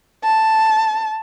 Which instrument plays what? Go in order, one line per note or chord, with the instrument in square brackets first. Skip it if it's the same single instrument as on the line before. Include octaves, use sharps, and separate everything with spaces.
[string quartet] A5